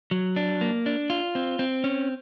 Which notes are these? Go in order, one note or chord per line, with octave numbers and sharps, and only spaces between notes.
F#3
D4
A#3
D4
F4
C4
C4
C#4